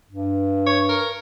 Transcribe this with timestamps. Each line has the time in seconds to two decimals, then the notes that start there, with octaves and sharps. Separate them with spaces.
0.09 G2
0.66 C#5
0.89 A#4